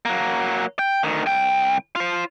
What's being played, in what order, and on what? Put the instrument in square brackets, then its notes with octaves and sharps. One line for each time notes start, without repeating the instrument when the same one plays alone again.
[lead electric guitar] F#3 A#3
G5
D2 D#3
C2 G5
F4 C5